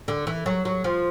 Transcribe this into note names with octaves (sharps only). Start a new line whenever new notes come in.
D3
E3
F#3
F#3
F3